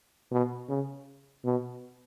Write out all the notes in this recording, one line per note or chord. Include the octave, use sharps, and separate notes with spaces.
B2
C#3
B2